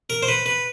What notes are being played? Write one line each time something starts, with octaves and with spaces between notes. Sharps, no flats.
A#4
C5
B4
B4